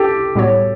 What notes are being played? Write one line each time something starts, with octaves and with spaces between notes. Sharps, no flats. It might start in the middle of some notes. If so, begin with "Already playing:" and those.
Already playing: C#4 G4 A4
A2 G3 B3 F#4 C#5